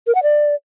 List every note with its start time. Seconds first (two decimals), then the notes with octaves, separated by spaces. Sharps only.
0.07 A#4
0.15 F#5
0.23 D5